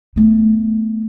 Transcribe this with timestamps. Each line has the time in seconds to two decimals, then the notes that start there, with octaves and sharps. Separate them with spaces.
0.16 A3 B3